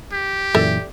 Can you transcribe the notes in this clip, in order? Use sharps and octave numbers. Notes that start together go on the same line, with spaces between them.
G4
F#2 A#2 E3 A4 D5 E5